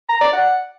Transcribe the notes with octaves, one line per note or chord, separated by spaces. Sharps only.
A#5
D5
F#5